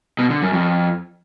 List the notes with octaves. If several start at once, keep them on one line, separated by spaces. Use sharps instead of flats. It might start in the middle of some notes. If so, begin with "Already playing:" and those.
B2
D3
F#2
F2